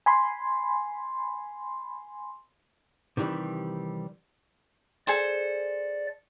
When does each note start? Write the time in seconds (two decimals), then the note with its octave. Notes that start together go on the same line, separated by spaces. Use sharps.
0.06 G#5 B5 C6
3.17 C3 D#3 E3 G3
5.07 G#4 A4 C5 D5